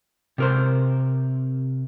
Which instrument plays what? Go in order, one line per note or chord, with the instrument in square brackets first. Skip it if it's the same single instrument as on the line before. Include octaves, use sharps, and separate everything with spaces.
[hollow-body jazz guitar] C3 A#4 C5